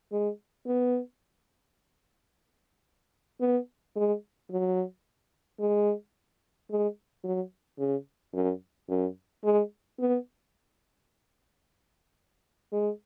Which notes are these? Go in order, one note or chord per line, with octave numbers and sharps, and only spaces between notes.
G#3
B3
B3
G#3
F#3
G#3
G#3
F#3
C#3
F#2
F#2
G#3
B3
G#3